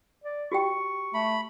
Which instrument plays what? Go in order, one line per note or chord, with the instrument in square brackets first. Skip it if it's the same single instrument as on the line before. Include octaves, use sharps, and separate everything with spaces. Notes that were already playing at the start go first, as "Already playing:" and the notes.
[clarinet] D5
[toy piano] F#4 G4 G5 [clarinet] C#6
[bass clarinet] A3 [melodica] B5